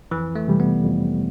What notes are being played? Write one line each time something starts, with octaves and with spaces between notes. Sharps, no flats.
F2 E3
A3
C3 E3 G3
B3
F2